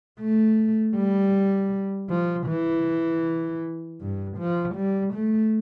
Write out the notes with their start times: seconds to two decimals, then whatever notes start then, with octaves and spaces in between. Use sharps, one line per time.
0.20 A3
0.96 G3
2.09 F3
2.48 E3
4.00 G2
4.39 F3
4.76 G3
5.14 A3